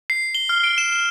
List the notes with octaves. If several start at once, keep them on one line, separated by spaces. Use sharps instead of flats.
C7
G7
F6
D7
E7
E7